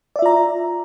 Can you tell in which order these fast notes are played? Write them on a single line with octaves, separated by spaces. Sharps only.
D5 E5 F4 A#5